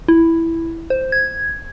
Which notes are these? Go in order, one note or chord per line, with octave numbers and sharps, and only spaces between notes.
E4
C5
G#6